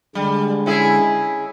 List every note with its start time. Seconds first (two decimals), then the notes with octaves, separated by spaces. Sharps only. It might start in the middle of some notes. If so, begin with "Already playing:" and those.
0.15 D3 G3 G#3
0.66 C#4 E4 G#4